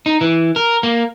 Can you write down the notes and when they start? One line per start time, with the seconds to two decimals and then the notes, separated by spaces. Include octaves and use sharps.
0.06 D#4
0.21 E3
0.56 A#4
0.83 A#3